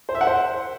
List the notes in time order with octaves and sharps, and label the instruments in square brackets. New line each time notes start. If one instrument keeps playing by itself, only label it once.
[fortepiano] C5
E5
F#5
C5